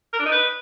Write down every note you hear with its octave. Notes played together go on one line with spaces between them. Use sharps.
A#4
D4
D#4
B4